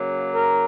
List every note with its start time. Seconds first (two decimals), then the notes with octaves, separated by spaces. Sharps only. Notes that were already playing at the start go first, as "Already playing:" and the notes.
Already playing: C#3 F#3 A#3
0.34 A#4